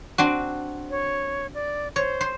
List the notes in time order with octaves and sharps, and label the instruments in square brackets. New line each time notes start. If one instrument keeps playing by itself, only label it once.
[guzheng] C4 D4 F#4
[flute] C#5
D5
[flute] C5 [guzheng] C#5
[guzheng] C5